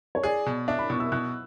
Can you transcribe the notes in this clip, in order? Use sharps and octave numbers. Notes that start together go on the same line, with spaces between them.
C#5
G#4 D5
B2
D4 E5
B5
B2 C#6
E6
B2 F#6